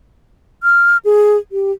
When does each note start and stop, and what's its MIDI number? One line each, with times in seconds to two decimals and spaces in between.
0.63 0.97 89
1.05 1.37 68
1.52 1.72 67